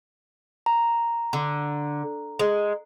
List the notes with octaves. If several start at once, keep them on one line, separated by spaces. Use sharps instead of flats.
A#5
D3
G#3